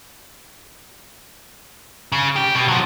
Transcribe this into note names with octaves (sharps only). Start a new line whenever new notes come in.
C#3
G4
B2
F3 F#3